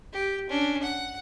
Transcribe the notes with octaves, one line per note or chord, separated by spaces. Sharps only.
G4
C#4 D4
F#5